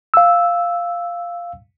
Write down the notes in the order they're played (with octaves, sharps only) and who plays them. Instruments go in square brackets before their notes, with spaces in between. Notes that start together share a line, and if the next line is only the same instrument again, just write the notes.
[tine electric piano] F5 E6